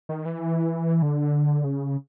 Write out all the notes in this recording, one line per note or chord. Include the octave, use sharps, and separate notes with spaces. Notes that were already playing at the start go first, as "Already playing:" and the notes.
D#3
E3
D3
C#3